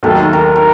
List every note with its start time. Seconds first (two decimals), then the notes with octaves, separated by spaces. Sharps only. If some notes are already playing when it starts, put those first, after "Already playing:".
0.03 D#2 D#3 F#3 A3 A4
0.33 A#4
0.56 A#4